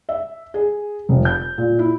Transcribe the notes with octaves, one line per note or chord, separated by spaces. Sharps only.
E5
G#4
F1
G6
A#2
E4